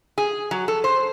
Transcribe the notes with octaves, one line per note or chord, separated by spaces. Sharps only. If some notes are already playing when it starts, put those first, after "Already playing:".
G#4
F#3
A4
C5